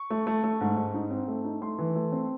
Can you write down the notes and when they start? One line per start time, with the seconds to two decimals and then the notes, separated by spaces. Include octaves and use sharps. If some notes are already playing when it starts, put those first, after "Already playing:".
Already playing: C#6
0.10 A3
0.27 A3
0.44 A3
0.61 G#2
0.77 G#2
0.94 D#4
1.11 C4
1.28 A3
1.44 D#4
1.61 A3 C6
1.78 E3
1.95 A3
2.12 C4